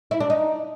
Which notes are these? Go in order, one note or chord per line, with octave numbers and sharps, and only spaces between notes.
E4
D4
D#4